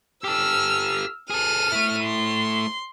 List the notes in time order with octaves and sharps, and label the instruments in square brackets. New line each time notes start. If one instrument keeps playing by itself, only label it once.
[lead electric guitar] G4 A4 [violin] E6 F6
[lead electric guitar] G#4 A4 [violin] F6 D#7
[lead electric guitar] A3 E4
[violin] C6